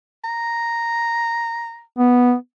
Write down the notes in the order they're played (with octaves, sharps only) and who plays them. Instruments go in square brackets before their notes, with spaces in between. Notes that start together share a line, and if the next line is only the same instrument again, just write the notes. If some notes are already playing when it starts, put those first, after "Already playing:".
[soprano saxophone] A#5
[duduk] B3